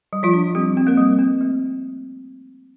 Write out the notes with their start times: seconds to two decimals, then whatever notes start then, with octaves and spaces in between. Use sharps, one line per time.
0.13 G3
0.23 F3 F4
0.34 D4
0.55 G3 C4 G4
0.77 C4
0.87 A#3 A#4
0.98 G3
1.19 C4
1.41 A3